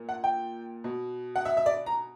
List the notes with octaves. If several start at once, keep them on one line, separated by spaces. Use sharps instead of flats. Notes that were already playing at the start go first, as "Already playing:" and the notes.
Already playing: A#2
F#5
G5
B2
F#5
E5
E5
D5
A#5